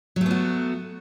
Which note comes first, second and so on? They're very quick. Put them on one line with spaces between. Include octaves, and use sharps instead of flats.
F#3 A3 B3 F#4